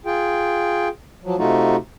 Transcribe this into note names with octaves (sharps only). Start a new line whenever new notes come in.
F4 G#4 G5
F3 F#3
C3 A3 D#4 F4 F#4